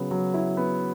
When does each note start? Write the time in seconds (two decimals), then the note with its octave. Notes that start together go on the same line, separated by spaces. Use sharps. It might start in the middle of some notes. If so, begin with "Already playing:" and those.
Already playing: C#3 F#3 B3
0.11 F#3
0.34 E4
0.57 B3